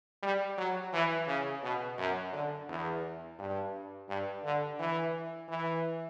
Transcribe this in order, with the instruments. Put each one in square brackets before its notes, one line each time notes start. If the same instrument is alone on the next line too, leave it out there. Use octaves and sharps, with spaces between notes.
[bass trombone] G3
F#3
E3
C#3
B2
F#2
D3
E2
G2
G2
D3
E3
E3